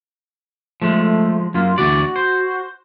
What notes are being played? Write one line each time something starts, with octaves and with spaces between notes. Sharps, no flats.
F3 G#3 A3
F#2 A#3 F4
D2 E3 F#4 D5
C5